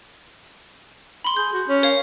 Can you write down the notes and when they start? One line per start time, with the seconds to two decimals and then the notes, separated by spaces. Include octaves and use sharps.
1.24 B5 C6
1.37 G#4 G6
1.53 F#4
1.68 C#4
1.83 A#4 C#5 F5